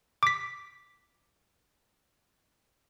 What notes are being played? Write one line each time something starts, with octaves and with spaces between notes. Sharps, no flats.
D6 B6